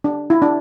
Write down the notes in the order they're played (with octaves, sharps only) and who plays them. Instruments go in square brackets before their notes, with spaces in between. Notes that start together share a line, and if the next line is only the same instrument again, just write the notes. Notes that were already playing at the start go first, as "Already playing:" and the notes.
[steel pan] D4
E4
D4